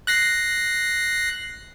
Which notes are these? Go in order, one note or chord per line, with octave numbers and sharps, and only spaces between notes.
F#6 A#6 C7